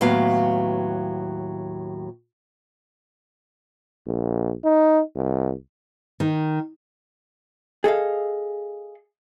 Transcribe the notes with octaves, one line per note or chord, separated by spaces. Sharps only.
D#2 A2 F#3 B3 F#4 F5
A#1
D#4
C2
D#3
G#4 A4 D#5 F5